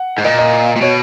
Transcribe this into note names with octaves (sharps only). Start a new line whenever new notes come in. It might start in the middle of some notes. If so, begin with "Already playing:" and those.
Already playing: F#5
G#2
A#2 D#5
D#5
A#2
B2 C#5